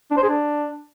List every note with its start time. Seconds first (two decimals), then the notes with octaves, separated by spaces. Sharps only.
0.11 D4
0.17 C5
0.23 G#4
0.29 D4